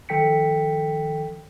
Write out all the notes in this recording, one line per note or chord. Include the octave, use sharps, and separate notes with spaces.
D#3 F3 A4 G5 B6 C#7